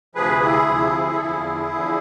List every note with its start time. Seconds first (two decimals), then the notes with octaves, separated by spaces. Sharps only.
0.15 D2 C3 F3 G#4 B4
0.41 E4 G#4
0.68 D2 C3 F3
1.16 A4
1.20 E2 D3 F3 E4 G#4
1.73 E2 D3 F3